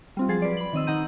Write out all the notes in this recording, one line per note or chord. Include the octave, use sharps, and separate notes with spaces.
G3 C4 F4
F3 F#3 G#4 A6 C7
B4 D5
B5 F#7
D#3 C4 D#5 E6
D#3 D#4 F#5 A#5 G6 D#7